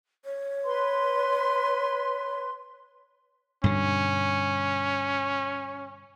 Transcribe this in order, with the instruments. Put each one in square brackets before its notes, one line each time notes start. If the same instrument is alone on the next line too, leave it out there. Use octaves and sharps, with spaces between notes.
[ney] C#5
[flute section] B4 C6
[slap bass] G2 B2 D3 [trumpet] C#4